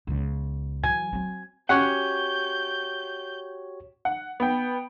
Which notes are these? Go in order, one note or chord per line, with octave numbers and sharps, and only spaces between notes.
C#2 B3
E3 F#3 G#5
F#3 C4
C#4 F#4 G4 C#5 F#5 G6
F#5
B3 G5